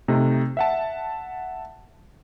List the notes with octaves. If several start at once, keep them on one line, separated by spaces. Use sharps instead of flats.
C3 A3 D#4
E5 F#5 A5